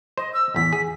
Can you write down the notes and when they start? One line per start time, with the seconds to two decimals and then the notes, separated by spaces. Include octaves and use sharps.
0.18 C5 D#5
0.33 E6
0.54 A1 E2 B6
0.73 G#4